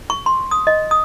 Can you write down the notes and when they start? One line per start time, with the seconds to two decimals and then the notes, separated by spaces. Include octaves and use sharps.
0.10 C#6
0.26 C6
0.51 D#6
0.67 D#5
0.91 D#6